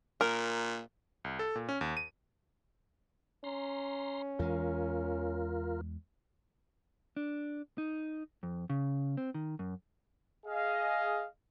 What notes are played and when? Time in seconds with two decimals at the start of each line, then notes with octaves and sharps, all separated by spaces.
0.21 A#2 A#4
1.24 C2
1.39 A4
1.55 A#2
1.69 C#4
1.81 D#2
1.97 D#7
3.44 C#4 A#5 C6
4.39 E2 E3 G#3 F4 A#4
7.17 D4
7.78 D#4
8.43 F2
8.70 C#3
9.17 C4
9.34 D#3
9.59 F#2
10.46 G#4 D#5 F5